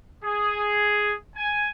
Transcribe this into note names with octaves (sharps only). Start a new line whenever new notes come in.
G#4
G#5